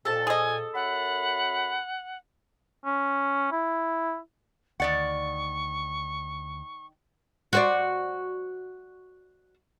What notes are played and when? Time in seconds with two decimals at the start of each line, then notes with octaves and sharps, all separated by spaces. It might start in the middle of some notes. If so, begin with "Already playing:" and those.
0.05 F2 A#2 A4 A5
0.27 G#4 D#5 G#5
0.74 F#2 F#5 B5
2.85 C#4
3.52 E4
4.80 D2 D#3 D5 F#5 C#6
7.53 F#4 C5 D5